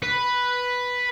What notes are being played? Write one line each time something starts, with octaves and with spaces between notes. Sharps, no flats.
B4